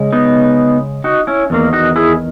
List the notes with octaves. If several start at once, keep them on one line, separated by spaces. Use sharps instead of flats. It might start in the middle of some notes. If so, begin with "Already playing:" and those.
Already playing: C#3 G#3
B3 D#4
D#4 F#4
C#4 E4
E2 D#3 A#3
D#4 F#4
E4 G#4